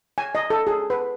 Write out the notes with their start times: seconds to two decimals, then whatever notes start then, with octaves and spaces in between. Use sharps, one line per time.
0.18 G#5
0.35 D#5
0.50 A4
0.67 G#4
0.90 B4